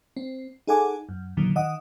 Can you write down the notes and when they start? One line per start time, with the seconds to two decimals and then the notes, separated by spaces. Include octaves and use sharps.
0.17 C4
0.67 D#4 G#4 A4 F#5 G#5 D6
1.09 F#2
1.37 E2 A#2 D3 D#3 F#3
1.55 D#3 D#5 F#5 D#6